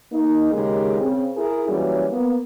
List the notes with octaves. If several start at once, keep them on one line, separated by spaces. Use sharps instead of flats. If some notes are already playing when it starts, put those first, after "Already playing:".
A#3 D#4
D#2 C#3 G#3 G4 G#4 A#4
C#3 C4
E4 G#4 A#4
E3 F#3 G3 A#3 C#4
A#3 B3